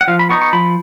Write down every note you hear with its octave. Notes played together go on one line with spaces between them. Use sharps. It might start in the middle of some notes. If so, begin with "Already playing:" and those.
F#5
F3 F5
B5
B3 D#4 C#6
C#6
F3 B5